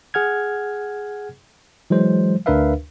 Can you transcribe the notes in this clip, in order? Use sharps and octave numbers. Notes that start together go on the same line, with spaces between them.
G#4 F#5 F6 G#6
E3 F#3 G#3 C5
D2 D4 A#4 B4 E5 F5